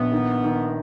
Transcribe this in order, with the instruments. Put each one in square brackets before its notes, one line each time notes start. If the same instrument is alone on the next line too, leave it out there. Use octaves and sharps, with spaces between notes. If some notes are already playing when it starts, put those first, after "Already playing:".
Already playing: [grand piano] A#1 [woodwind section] B3
[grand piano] D#3
D#3